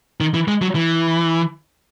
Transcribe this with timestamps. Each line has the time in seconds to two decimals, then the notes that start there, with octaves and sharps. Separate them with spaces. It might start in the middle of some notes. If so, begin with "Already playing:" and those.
0.20 D#3
0.34 E3
0.48 G#3
0.62 F#3
0.75 E3